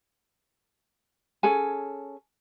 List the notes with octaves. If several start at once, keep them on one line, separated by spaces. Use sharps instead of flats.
C#4 G#4 A4 G#5